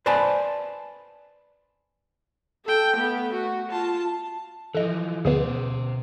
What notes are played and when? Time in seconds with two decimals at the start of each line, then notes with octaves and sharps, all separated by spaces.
0.06 B4 C5 D5 G#5 A5 B5
2.65 A4 G5
2.96 A3 B3
3.32 F#4
3.70 F4 A5
4.75 E3 F3 A4 D#5
5.25 D2 B2 B3 G#4 C5